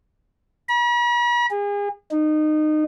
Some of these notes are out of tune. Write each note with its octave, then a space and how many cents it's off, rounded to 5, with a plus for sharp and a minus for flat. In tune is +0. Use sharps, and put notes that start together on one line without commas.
B5 -45
G#4 -35
D#4 -25